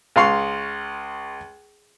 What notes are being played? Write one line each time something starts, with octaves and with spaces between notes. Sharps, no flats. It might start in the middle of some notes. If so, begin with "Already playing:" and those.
C#2 F5 C6 C#6